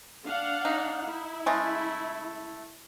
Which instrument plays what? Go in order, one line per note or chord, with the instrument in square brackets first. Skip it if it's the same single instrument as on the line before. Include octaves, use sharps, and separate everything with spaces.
[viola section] D4 F5 F#5
[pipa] D#4
[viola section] E4
[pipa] C#3 G#3 A3